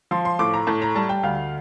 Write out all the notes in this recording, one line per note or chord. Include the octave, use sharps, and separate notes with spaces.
F3 C6
C6
A2 D6
A#5
A2 A5
A#5
G3 A5
G5
D2 F5